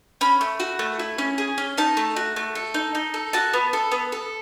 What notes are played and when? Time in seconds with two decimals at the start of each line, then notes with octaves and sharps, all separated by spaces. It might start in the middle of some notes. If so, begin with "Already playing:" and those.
0.21 C#4 B5
0.41 A3
0.60 F#4
0.79 A3
0.99 E4
1.18 C#4
1.38 G#4
1.58 C#4
1.78 D#4 A5
1.97 A3
2.16 F#4
2.36 A3
2.55 A4
2.74 D#4
2.95 D#4
3.14 A4
3.33 F#4 A5
3.53 B3
3.73 A4
3.92 B3
4.12 A4